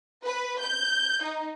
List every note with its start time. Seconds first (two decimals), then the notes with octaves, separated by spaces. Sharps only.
0.25 B4
0.61 G6
1.23 D#4